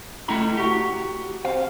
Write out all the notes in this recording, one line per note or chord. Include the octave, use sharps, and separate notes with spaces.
C#2 A3 E4 A#5
F#4 G4 C#6
C4 F5